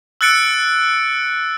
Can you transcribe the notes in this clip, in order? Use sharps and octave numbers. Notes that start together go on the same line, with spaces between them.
E6 F#6 A6 C#7 D7